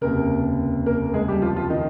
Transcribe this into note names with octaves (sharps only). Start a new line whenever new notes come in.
F1 D#2 C#3 A#3 A#4
A#3 A#4
G#3 G#4
G3 G4
F3 F4
F3 F4
D#3 D#4